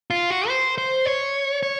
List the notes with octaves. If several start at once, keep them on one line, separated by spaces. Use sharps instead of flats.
F4
F#4
C5
C5
C#5
C#5